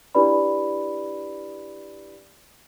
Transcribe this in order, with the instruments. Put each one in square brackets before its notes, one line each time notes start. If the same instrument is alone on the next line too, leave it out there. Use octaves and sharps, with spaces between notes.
[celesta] D4 E4 G4 B4 D5 B5